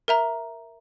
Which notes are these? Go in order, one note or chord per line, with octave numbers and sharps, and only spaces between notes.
A#4 E5 A#5